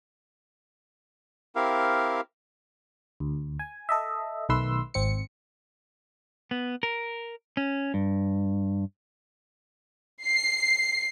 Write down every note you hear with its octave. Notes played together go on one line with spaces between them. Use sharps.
C4 E4 G4 A#4 F5
D2
G#5
A4 D#5 E5
B1 D#3 A3 B4 C6 E6
G#1 C4 C#7
B3
A#4
C#4
G2
C7